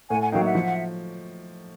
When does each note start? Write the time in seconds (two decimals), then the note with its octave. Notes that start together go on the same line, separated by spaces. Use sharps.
0.10 A2 F#5 G#5
0.21 F#5 G#5
0.32 F#3 A#3 D#4 F5 G5
0.43 E5 F#5
0.55 F3